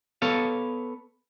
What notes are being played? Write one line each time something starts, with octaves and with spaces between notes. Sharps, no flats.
B3 A4 C#5 F5